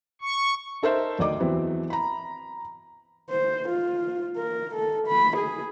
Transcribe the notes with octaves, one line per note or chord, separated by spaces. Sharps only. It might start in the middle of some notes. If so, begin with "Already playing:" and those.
C#6
D#4 A4 A#4 C5 E5
D2 D#3 D5 D#5 D6
E2 E3 F#3 C4
A#5 B5
C5
F4
A#4
A4
B5
G#4